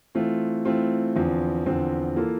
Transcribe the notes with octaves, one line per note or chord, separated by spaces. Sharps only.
E3 A3 C4 F4
E3 A3 C4 F4
E2 D3 F3 C4
E2 D3 F3 C4
E3 A#3 F4 A4